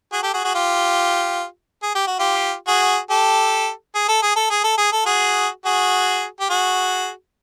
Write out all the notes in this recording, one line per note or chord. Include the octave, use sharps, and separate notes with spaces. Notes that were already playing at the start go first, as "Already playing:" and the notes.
F#4 G#4
G4 A4
F#4 G#4
F#4 G#4
F4 G4
G#4
G4
F#4
F4 G4
F#4 G#4
G4 A4
G#4
A4
G#4
A4
G#4
A4
G#4
A4
F#4 G#4
F#4 G#4
G4
F#4 G#4